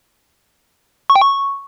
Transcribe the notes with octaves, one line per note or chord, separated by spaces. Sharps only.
C#6
G5
C#6